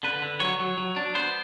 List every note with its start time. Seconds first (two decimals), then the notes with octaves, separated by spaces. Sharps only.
0.03 D3 B4
0.22 D3
0.40 F#3 C#5
0.59 F#3
0.78 F#3
0.96 D4
1.15 B3 C5